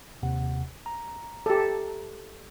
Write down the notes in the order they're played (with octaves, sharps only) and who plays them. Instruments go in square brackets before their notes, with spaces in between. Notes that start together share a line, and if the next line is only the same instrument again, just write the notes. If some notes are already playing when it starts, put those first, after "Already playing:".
[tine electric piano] D#2 C3 F#5
A#5
[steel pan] G4 A4